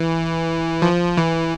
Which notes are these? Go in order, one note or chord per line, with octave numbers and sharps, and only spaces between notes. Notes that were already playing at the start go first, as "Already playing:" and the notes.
Already playing: E3
F3
E3